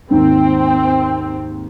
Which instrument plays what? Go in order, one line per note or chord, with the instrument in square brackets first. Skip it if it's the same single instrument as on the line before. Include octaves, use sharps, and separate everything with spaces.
[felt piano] D#2 G#2 [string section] C4 [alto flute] G5